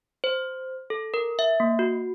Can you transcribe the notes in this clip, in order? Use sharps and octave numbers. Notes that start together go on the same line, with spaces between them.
C5
A4
A#4
E5
A#3
F#4